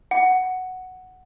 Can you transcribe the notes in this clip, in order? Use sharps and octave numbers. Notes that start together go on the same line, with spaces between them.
F#5